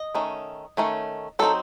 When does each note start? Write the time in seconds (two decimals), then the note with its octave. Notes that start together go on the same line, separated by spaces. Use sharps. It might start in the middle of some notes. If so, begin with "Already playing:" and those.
Already playing: D#5
0.15 D#3 A3 C#4
0.77 D#3 A3 C#4
1.39 F#3 C4 D#4 A4